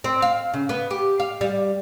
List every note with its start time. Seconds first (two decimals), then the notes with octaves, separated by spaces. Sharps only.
0.04 C4
0.22 F5
0.54 C#3
0.69 B3
0.91 G4
1.20 F5
1.41 G3